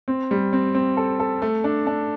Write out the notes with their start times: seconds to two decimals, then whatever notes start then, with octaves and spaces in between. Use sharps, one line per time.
0.08 C4
0.31 G3
0.53 C4
0.74 C4
0.97 A4
1.20 A4
1.42 A3
1.64 D4
1.87 D4